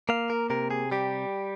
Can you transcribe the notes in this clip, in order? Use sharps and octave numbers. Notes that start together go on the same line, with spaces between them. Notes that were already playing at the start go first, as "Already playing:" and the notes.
A#3 F5
A#4
C3 A#4
G#4
G3 G4